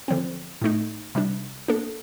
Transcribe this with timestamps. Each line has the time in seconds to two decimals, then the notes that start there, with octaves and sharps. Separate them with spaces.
0.08 D3 F3 C4
0.61 A2 A3 D#4
1.15 C3 G3 D4
1.68 A#3 D4 A4